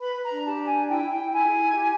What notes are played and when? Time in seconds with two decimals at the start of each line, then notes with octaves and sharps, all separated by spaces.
0.01 B4 B5
0.16 B4
0.23 A#5
0.30 D4
0.45 G4 A5
0.59 D4
0.67 G#5
0.74 D4
0.88 E4 G5
1.03 E4
1.11 G5
1.17 E4
1.32 E4 G#5
1.47 G#4
1.62 E4
1.75 G4